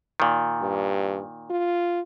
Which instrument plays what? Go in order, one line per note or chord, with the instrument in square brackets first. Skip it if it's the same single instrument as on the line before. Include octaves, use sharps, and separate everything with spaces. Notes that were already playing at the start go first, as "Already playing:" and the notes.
[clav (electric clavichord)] A#2 D#3
[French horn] G2
F4